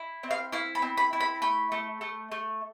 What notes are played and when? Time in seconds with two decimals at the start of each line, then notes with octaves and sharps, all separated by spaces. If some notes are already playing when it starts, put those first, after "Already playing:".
Already playing: E4
0.23 C4
0.31 F5
0.52 E4 F5
0.75 B5
0.82 C4
0.97 B5
1.13 E4
1.20 B5
1.42 A3 B5
1.72 A3
2.01 A3
2.32 A3